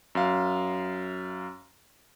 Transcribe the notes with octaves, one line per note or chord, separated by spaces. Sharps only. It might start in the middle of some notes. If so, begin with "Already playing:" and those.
F#2 F5